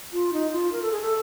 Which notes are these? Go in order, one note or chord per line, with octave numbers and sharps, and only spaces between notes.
F4
D#4
F4
A#4
A4
G#4
A4